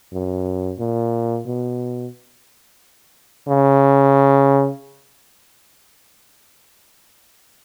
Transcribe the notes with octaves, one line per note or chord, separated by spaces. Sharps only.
F#2
A#2
B2
C#3